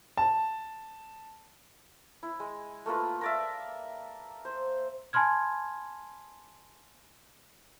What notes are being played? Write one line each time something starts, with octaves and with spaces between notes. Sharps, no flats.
A5
E4
G#3
A3 A#3 F4 B4
A#4 D5 E5
C5
G#5 A5 B5 C6 F6 G#6